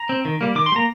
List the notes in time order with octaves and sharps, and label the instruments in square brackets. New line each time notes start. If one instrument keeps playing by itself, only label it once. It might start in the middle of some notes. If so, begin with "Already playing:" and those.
Already playing: [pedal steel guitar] A#5
C4
D#3
G3 A#3
D#3 D6
C6
G3
A#3 A#5